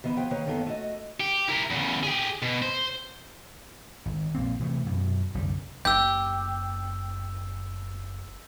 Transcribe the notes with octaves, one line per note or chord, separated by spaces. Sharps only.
D#3 E3 B3
F3 B3 G#4 G5
D#3 A#3 B4 C#5
F#2 D#3 A#3 B3 A4
A3 F#4 D#5
G4
E4 A#4
E2 C#3
G4 G#4
B2
C5
G#1
A#1 A#3 C4
C3 E3 F#3 A3
F#2 B2
G1 C2 F#2 G3
F#1 G4 E6 G6